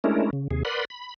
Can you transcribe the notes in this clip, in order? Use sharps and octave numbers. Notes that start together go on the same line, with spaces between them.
G#3 A3 C#4 D4 E4 A#4
C#3
D#2 C3 G#4
A#4 B4 D5 F#5 B5 C6
B5